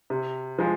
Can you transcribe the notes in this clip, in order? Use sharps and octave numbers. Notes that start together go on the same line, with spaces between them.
C3
F3 G#3